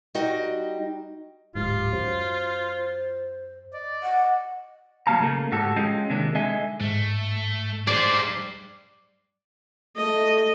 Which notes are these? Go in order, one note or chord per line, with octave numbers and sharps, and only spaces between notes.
G3 D#4 F#4 D#5 G5
D1 G#2 F4 G4
F#2 F#3 C5
D5 D#5
F#5
F#3 G3 A#3 F5 A5 A#5
C#3 A3 A#3
G#2 F#4 G4 A4
G#3 C#4 F4 G#4 D#5 G5
C3 D#3 G#3 A#3 D4
D3 G#3 D#5 E5 G#5
G#2 A3
G2 G3 G#4 C5 D5
A3 D#5